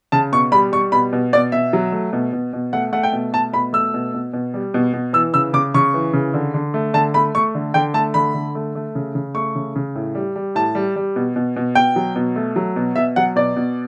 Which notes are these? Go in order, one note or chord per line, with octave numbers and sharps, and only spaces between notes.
C#3 A5
B2 C#6
G3 B5
G3 C#6
B2 B5
B2
B2 D5
B2 E5
F#3
A3
B2
B2
B2
A3 F#5
A3 F#5
G5
B2
A3 A5
B2 B5
A3 E6
B2
B2
B2
G3
B2
B2
E3 E6
C#3 E6
C#3 D6
C#3 C#6
E3
C#3
D3
D3
A3
D3 A5
A3 B5
A3 C#6
D3
D3 G5
A3 A5
D3 B5
D3
A3
A3
C#3
C#3
A3 C#6
C#3
C#3
A2
G3
G3
A2 A5
G3
G3
B2
B2
B2
B2 G5
F#3
B2
A3
F#3
B2
B2 E5
F#3 F#5
B2 D5
B2